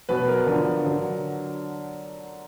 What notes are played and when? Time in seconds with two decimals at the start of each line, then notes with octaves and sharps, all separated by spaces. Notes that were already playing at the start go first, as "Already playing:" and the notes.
0.09 B2 F#3 B4
0.28 A#4
0.46 D3 F3
0.84 D3 F#3